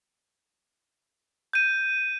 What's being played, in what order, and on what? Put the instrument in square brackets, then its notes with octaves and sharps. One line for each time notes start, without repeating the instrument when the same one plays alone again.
[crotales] G6 D#7